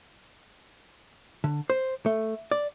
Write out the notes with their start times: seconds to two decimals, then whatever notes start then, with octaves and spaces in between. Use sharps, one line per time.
1.44 D3
1.70 C5
2.06 A3
2.51 D5